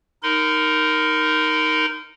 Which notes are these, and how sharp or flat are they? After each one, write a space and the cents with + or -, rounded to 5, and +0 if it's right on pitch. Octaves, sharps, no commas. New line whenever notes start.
D#4 +0 A#4 +0 C6 -45